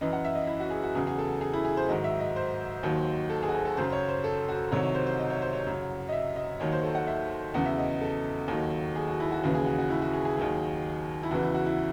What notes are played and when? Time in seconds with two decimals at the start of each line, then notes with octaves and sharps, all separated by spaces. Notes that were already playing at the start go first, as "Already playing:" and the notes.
0.01 F#2 E3 D#5
0.13 F#5
0.25 E5
0.35 D#5
0.47 E4
0.60 F#4
0.70 G#4
0.83 F#4
0.95 E2 C#3 F#3 G#4
1.07 G#4
1.18 A4
1.41 G#4
1.53 E4
1.65 G#4
1.77 C5
1.89 G#2 D#3 F#3 D#5
2.04 E5
2.20 D#5
2.36 C5
2.83 D#2 D#3 F#3
3.30 A4
3.43 G#4
3.49 F#4
3.54 G#4
3.65 A4
3.77 F#2 C#3 F#3 C5
3.92 C#5
4.09 C5
4.24 A4
4.49 F#4
4.72 C2 C3 D#3 F#3 C#5
4.83 C#5
4.95 C5
5.06 C5
5.19 D#5
5.30 C#5
5.42 C5
5.53 C#5
5.66 F#2 C#3 F#3
6.09 D#5
6.12 E5
6.36 D#5
6.60 D#2 D#3 F#3 C#5
6.72 C5
6.83 A4
6.95 F#5
7.07 E5
7.54 E2 C#3 F#3 F#5
7.66 E5
7.78 D#5
8.01 A4
8.48 D#2 D#3 F#3
8.96 G#4
9.07 F#4
9.20 E4
9.32 F#4
9.43 D#2 C#3 E3 F#4
9.54 G#4
9.66 F#4
9.78 F#4
9.90 E4
10.02 F#4
10.13 G#4
10.25 G#4
10.37 D#2 D#3 F#3
11.23 E4
11.31 E2 C#3 E3 F#4
11.43 E4
11.54 F#4
11.66 E4